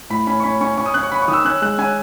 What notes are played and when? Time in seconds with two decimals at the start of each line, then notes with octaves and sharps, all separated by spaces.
0.10 A2 B5
0.27 C#4 B5
0.40 C#6
0.44 C#4 B5
0.61 C#4 C#6
0.77 C#4 C#6
0.86 D#6
0.94 C#4 F#6
1.03 C#6
1.11 C#4 B5
1.22 C#6
1.28 D#3 D#6
1.33 E6
1.45 C#4 F#6
1.62 G#3 F#6
1.78 C#4 G#5